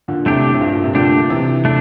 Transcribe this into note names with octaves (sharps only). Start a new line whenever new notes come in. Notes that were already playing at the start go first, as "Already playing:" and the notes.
A#2 D3
A2 C3 A3 D4 G4
C3
G2 A#2
A#2
C3
A#2 D3 A3 D4 G4
C3 E3
A3 D4